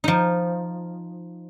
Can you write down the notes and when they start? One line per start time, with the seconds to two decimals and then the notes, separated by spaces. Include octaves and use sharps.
0.04 F3 D#4